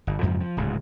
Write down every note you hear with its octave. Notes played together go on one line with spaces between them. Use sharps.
G1
F2 G#2 C#3 F3
F3
D1 C#2 G#2